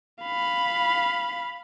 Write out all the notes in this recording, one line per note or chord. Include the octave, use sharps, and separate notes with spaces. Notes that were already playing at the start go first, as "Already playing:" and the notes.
F5 B5